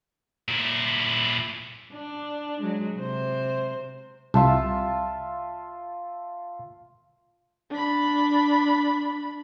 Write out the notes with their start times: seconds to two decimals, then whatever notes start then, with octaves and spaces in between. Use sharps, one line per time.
0.48 A#2 E4
1.93 D4
2.61 F#3 G#3
2.97 C3 C5
4.34 C2 F4 E5 A5
7.71 D4 B5